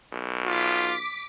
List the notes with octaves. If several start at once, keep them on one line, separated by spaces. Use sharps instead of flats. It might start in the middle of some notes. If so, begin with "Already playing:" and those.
B1
F4 D6 B6